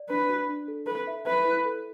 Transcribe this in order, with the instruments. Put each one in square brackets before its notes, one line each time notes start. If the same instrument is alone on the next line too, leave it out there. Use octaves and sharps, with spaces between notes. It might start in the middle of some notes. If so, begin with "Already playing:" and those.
Already playing: [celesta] D5
[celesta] D4 [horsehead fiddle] B4
[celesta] F#4
D4
A4
[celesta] A4 [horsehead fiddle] B4
[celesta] E5
[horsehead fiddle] B4 [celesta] E5
[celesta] E4
A4